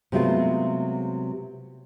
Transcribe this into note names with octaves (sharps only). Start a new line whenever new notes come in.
C3 F#3 G#3 A3 B3 F4